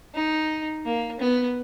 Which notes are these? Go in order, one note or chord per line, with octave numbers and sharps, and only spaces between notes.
D#4
A#3
B3